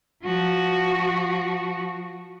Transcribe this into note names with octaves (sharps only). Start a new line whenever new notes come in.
F3 F#4